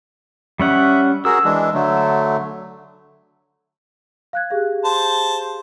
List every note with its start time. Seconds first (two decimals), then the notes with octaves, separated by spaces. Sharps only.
0.59 G3 C#4 E5 F#5
1.25 F#4 G#4 A#4 E6
1.45 E3 G#3 D4
1.74 D3 F#3 A3
4.33 F5 F#6 G#6
4.51 G4 G#4 F5
4.84 C5 A5